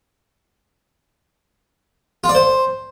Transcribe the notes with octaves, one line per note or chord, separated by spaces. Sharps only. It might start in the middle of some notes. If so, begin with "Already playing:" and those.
F4
D5
C5